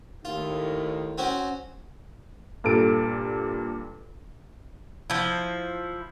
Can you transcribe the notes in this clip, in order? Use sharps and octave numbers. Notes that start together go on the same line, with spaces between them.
D#2 A2 D#3 F4
C4 C#4 F#4
G2 A#2 A4 D7
F3 E4